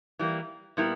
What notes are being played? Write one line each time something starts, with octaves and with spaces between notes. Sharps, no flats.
E3 G3 A#3
A#2 G3 B3 E4 A#4